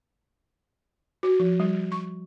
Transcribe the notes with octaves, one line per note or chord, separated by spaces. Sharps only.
F#4
F3
G3
C#6